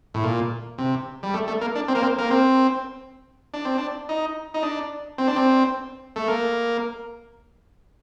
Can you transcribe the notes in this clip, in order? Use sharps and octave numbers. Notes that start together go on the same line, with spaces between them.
A2
A#2
C3
G3
A3
A3
A#3
D4
C4
A#3
C4
A#3
C4
D4
C4
D4
D#4
D#4
D4
C4
D4
C4
A3
A#3